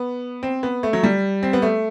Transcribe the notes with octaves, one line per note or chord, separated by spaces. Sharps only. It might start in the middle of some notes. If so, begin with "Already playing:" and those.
Already playing: B3
C4
B3
A3
F#3
G3
C4
B3
A3